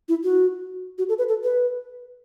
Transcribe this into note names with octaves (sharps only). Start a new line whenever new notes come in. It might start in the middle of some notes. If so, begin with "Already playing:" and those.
E4
F#4
F#4
A4
B4
A4
B4